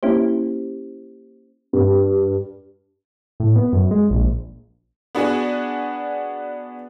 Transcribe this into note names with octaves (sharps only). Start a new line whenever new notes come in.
A#3 C#4 E4 G4 C5
G2
A2
B3
F#2
G#3
A#1
B3 D4 F#4 G#4